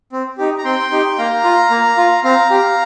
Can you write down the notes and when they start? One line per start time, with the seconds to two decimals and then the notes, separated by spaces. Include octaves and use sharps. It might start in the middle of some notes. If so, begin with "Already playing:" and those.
0.12 C4
0.38 D#4 G4
0.58 A#5
0.65 C4 G5 C6
0.92 D#4 G4
1.18 A#3 F5 A#5
1.44 F4
1.70 A#3
1.97 F4
2.24 C4 F5 A#5
2.50 G4